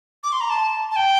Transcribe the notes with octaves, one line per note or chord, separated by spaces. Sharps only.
D6
C6
A#5
A5
A5
G5